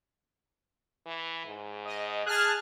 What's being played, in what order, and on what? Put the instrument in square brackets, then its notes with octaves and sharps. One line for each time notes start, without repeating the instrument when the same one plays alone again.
[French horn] E3
G#2
[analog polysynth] D#5
[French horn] G#4 [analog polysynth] A5 F6 F#6